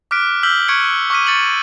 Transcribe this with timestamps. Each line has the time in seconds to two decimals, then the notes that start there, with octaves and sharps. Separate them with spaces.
0.11 D6 F6 F#6 B6 D7
0.43 E6 F6 G6 B6 F#7 G7
0.68 C#6 F#6 G#6 C#7 D7
1.10 C#6 D6 F6 B6 D#7
1.27 C#6 A6 C#7 F#7